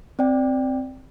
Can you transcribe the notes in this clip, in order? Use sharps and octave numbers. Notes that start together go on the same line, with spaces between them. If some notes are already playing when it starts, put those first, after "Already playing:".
C4 D5 G5